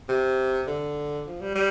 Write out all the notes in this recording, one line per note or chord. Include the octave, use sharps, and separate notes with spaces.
C3
D3
F3
G3
G3